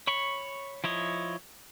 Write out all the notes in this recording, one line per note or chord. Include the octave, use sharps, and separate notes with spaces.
C#5 B5 C#6
F3 E4 C#5 D#5